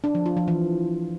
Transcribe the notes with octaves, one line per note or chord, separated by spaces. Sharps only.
D4
F3
F4
F3
E3